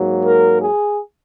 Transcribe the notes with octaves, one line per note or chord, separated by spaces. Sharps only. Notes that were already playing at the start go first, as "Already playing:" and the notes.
Already playing: G#2 F#3 A#3
A#4
G#4